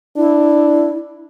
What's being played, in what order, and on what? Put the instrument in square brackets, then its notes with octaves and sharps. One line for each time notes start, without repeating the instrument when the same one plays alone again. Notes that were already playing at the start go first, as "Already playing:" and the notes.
[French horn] D4 [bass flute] E4